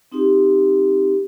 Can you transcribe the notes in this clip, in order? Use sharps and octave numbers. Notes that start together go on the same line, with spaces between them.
C4 D#4 F4 G4